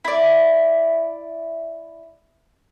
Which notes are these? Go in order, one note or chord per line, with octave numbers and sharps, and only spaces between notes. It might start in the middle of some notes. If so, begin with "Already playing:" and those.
E4 D5